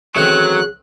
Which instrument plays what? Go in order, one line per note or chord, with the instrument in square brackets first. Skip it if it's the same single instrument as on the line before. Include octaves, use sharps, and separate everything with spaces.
[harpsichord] A1 D#3 C4 [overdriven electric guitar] F#3 [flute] G#4 [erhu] F#6